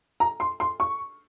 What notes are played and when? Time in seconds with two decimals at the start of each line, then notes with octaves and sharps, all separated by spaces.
0.20 A#5
0.40 C6
0.60 C6
0.80 C#6